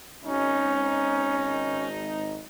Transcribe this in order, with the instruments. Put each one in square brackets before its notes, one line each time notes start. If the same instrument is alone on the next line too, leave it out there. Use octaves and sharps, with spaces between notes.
[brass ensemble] G#1 D#4 [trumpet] C#4